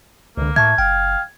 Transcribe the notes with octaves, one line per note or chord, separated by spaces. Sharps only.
C#2 D3 A#3
A2 E5 A5 C#6 G#6
F#1 F5 G5